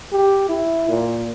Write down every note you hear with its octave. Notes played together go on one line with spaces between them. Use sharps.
G4
E4
A#2